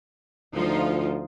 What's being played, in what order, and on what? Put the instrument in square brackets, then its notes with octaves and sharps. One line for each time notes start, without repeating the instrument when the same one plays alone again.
[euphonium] D2 [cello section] F3 D#4 F4